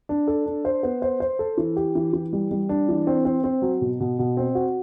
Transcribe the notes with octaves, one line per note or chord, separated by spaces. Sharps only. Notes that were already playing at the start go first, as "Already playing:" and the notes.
D4
A4
D4
C5
B3
C5
C5
A4
E3
G4
E3
E3
G3
G3
D4
E3
C4
C4
C4
F#3
B2
B2
B2
C4
F#4